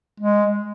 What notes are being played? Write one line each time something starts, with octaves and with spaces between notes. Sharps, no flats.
G#3